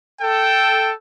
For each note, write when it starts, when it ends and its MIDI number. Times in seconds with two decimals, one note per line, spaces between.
0.21 0.91 69
0.21 0.91 79